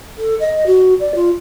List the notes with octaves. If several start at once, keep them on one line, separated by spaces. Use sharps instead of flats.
A4
D#5
F#4
D5
F4